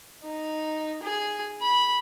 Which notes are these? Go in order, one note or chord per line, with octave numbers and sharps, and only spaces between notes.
D#4
G#4
B5